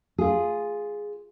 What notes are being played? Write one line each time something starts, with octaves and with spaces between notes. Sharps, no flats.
F4 G#4